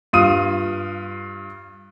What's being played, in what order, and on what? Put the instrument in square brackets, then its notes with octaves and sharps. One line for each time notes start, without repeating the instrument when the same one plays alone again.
[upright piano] G2 F4 D#6 D#7